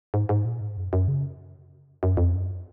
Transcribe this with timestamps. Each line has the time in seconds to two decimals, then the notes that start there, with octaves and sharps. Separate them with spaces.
0.14 G#2
0.29 G#2
0.45 A#2
0.61 G#2
0.77 F#2
0.93 F#2
1.08 C#3
2.03 F#2
2.17 F2
2.34 F#2